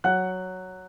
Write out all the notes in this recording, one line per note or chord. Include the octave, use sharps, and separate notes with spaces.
F#3 F#5 F#6